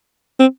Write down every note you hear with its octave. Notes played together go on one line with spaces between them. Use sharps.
C4